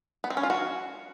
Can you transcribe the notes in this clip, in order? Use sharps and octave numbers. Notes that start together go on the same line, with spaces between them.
B3
C4
C#4
F4
F#4